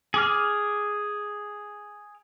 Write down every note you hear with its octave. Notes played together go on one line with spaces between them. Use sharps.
G#4 D6 F6